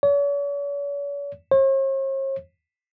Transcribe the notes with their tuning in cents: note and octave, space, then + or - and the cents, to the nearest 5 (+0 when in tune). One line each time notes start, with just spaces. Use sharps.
C#5 +45
C#5 -45